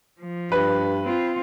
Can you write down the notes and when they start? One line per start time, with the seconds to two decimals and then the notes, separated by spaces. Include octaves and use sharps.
0.21 F3
0.52 G2 B4
1.03 C4 F4